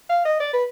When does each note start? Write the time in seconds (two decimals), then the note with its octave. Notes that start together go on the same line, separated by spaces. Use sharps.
0.09 F5
0.25 D#5
0.40 D5
0.53 B4